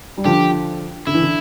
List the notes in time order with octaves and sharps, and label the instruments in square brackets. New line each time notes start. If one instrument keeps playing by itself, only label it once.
[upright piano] G3
[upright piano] D3 F3 [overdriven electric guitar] G4
[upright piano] D3 [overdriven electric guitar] E4
[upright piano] E3
D3